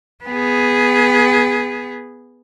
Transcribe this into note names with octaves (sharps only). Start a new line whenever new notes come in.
B3 G#4